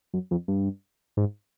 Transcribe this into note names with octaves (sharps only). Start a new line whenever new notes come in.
F#2
F2
G2
G#2